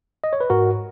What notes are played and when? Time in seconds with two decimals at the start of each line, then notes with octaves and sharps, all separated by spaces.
0.24 D#5
0.33 C#5
0.41 B4
0.50 G#2 F#4 A#4